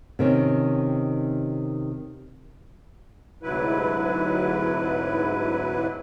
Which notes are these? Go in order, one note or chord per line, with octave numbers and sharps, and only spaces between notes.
C3 D#3 C#4
D2 G#2 C3 F#3 E4 B4